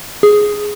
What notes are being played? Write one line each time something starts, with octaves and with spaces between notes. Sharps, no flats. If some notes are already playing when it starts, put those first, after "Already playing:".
G#4